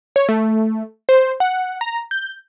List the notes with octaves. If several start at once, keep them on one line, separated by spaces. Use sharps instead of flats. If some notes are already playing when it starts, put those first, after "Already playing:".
C#5
A3
C5
F#5
A#5
G6